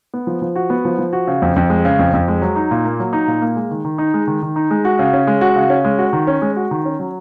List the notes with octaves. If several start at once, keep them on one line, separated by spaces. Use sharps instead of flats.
B3
F3
F3
F#4
B3
F3
F3
F#4
C#3
F2
F2
G#3
C#3
F2
F2
G#3
F#3
D#4
A#2
A#3
F#3
D#4
A#2
A#3
G#3
D#3
D#3
D#4
G#3
D#3
D#3
D#4
G#3
F#4
C#3
C#4
G#3
F#4
C#3
C#4
G#3
F#4
D#3
C#4
G#3
F#4
D#3
C#4
F#3